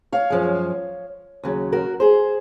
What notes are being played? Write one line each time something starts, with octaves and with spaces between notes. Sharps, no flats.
C#5 F5
F#2 F3 G#3
D#2 C#3 F#3
F#4 A#4
G#4 C5